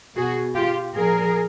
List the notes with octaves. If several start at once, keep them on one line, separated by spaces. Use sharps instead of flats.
B2 F#4 G#4
F4 G4
A#2 F3 G#4 A#4